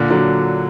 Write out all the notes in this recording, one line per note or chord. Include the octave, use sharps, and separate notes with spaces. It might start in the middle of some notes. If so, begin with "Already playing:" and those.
Already playing: A#2 D3
D3 F#3